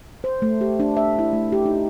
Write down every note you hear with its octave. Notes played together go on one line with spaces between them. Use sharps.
C5
A3
G4
D4
E5
E4
A3
G4
D#4